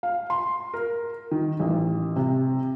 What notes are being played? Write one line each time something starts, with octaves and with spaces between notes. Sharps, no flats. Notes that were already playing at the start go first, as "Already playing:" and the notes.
F5
C6
A#4
D#3
A1
C3